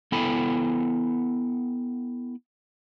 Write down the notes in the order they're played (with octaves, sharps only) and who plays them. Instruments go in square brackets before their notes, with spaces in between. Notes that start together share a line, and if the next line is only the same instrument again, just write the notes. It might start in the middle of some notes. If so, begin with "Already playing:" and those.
[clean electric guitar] B3 E4 A4 G5 G#5 B5